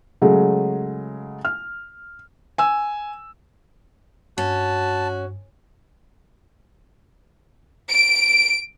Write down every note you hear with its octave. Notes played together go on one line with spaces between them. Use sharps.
C#3 F#3 G#3 A3
F6
G#5 E6
G2 C#4 F#4 A5
D7